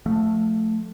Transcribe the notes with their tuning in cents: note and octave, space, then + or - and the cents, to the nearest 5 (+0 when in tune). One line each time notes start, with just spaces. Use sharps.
F3 +30 A3 +0